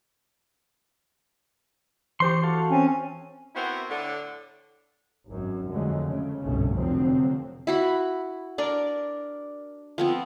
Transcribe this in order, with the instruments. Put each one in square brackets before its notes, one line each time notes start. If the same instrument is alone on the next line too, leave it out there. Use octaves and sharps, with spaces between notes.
[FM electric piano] E3 C#6 [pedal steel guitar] G4 C5 C6
[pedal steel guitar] F#4 A4 F5
[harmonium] C4 C#4
[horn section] B3 C4 E4 F#4 A#4 C5
A2 D3
[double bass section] G#1 F#2
F2 D3 F3 F#3 G#3 A3
C#3 A3
G1 C2 G#2 B2 A3 C#4
F1 F2 D3 F3 F#3 C4
[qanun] E4 F#4 B5
D4 A#4 D5
F3 B3 C4